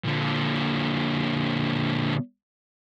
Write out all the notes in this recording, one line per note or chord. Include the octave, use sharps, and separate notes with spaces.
A#2 D3